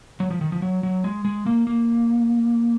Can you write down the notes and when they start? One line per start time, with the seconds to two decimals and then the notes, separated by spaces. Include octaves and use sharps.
0.20 F#3
0.31 F3
0.41 D#3
0.52 F3
0.62 F#3
0.83 F#3
1.04 G#3
1.25 G#3
1.46 A#3
1.67 A#3